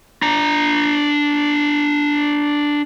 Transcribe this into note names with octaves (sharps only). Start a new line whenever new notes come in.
D4 A#5